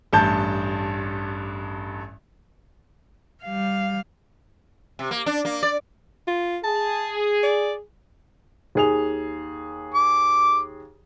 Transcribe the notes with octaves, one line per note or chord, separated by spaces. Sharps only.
A1 G2 A5 G6
G3 F5
C3
A#3
D4
A#3
D5
F4
G#4 A5
D5
D#2 G#4 F7
D6